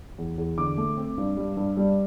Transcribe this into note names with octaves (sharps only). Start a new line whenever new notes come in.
E2
E2
D3 D6
A3
C4
G2
G3
G2
G3